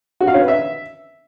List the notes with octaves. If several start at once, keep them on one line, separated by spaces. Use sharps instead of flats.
F#4
F5
C#4
B4
E5